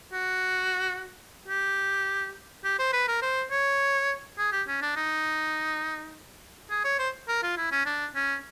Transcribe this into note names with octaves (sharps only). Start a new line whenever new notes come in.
F#4
G4
G4
C5
B4
A#4
C5
C#5
G#4
G4
C#4
D4
D#4
G#4
C#5
C5
A#4
F4
E4
C#4
D4
C#4